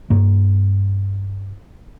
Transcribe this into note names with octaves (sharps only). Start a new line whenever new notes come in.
G2 A#3